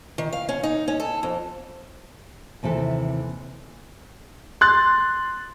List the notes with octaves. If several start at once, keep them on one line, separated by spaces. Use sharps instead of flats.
D#3
F5
C#4
D#4
C#4
A4
F2
D#2 C3 E3 A4 B4
C6 F#6 A6